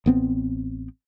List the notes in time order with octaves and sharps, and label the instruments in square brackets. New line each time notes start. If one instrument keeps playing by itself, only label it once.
[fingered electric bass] A1 B3 C4